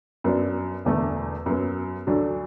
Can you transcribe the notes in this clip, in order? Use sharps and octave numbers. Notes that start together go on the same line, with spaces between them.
F#2 F#3 B3 D4
E1 E2 D3 A3
F#2 F#3 B3
D2 D3 F#3 D4